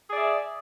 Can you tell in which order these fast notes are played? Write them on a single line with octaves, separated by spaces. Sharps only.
G#4 D5 E5